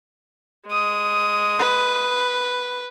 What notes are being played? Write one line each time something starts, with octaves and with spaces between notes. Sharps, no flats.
G#3 D#6
B4